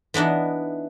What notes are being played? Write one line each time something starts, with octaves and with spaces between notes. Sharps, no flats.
E3 B3 D4 D#4